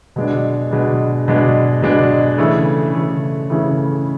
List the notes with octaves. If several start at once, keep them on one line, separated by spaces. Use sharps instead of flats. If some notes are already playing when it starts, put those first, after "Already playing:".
B2 G#3 D4
B2 G#3 D4
B2 G#3 D4
B2 G#3 D4
C#3 E3 A3
C#3 E3 A3
C#3 E3 A3